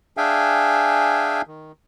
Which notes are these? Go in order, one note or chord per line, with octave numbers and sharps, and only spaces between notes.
D4 G#4 E5 F5 G5 G#5
D#3